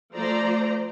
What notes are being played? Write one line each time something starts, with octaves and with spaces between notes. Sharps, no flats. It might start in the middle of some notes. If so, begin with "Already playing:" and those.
F3 A3 C5 D5 A#5